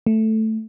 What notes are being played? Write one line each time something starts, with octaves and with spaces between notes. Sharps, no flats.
A3